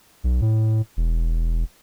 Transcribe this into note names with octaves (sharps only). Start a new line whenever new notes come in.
B1
A2
E1